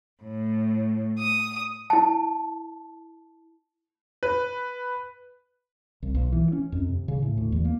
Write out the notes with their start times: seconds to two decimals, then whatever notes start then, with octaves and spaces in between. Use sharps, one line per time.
0.23 A2
1.18 D#6
1.90 E4 A5
4.23 B4
6.02 C2
6.15 B1
6.32 E3
6.52 C#4
6.72 F2
6.89 C3
7.08 C#3
7.23 A2
7.37 D2
7.52 E2
7.65 A#3